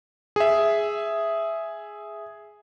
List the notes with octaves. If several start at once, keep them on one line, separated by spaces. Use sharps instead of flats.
G#4 E5